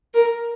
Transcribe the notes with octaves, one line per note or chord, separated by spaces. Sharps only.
A#4